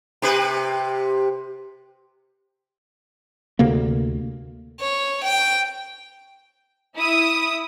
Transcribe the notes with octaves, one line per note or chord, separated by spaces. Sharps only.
C3 G4 B4
D2 C3 A#3
C#5
G5
E4 D#6